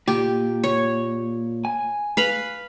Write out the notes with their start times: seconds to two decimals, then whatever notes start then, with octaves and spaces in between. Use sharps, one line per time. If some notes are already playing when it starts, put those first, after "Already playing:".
0.08 A#2 G4
0.64 C#5
1.65 G#5
2.17 B4 F5 B5